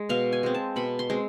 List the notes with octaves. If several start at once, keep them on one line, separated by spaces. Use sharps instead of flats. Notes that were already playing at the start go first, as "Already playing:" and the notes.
Already playing: G#3
B2 F5
G#5
G#3 C4
A5
B2 B5
C6
G#3 C4